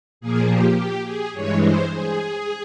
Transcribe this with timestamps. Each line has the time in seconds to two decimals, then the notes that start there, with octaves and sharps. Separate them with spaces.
0.21 A#2 F3 A#3 G#4
0.49 G4
0.76 G4
1.05 G#4
1.33 G2 E3 G#3 C#5
1.62 C5
1.89 G#4